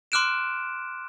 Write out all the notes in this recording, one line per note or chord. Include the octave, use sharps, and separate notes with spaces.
C6 D6 F6 F#6 D7 E7